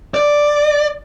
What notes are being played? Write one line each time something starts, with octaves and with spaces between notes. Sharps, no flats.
D5